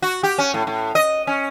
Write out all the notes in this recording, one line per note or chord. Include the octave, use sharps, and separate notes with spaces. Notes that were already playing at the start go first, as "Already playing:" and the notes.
F#4
G4
C#4
A2
A2
D#5
C#4